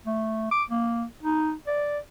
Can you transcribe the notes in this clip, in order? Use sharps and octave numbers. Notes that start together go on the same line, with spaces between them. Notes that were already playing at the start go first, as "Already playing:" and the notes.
A3
D6
A#3
D#4
D5